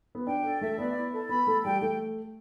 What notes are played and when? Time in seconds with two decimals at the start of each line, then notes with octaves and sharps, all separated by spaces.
0.15 B3
0.26 D4 G5
0.43 D4 A4
0.61 A3 E5
0.78 B3 D5
0.96 E4
1.13 A4
1.29 B3 B5
1.47 A3 A4
1.64 G3 G5
1.81 A3 G5